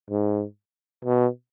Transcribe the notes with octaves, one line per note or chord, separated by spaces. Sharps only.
G#2
B2